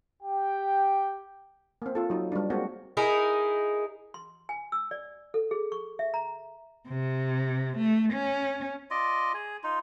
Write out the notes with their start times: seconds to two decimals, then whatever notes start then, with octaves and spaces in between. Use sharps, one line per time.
0.23 G4 G5
1.82 A#3 C4
1.95 F4 A4
2.10 F#3 D#4
2.32 G3 D4
2.50 G#3 A#3 C4 F#4
2.97 D#4 E4 G#4 A#4
4.14 C6
4.49 G#5
4.72 E6
4.91 D5
5.34 A4
5.51 G#4
5.72 C#6
5.99 E5
6.14 A#5
6.89 C3
7.78 A3
8.13 C#4
8.91 F4 D5 D#5
9.34 G#4
9.64 D#4 F4